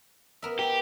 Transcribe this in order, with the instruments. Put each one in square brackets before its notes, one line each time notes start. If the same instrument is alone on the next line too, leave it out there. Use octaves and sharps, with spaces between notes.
[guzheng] B3 A#4 E5
[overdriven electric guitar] G4